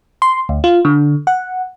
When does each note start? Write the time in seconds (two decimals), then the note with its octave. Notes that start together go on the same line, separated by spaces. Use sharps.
0.22 C6
0.49 D2
0.64 F4
0.85 D3
1.27 F#5